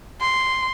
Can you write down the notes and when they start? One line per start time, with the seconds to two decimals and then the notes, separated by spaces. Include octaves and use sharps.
0.21 C6